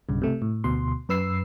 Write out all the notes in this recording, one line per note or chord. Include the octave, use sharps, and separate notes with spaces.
B1 G2 C#3
C3 A3
A2
D2 B2 C6
F#2 B4 E6 C7